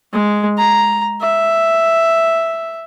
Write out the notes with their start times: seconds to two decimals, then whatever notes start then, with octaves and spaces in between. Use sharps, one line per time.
0.13 G#3
0.58 A#5
1.21 E5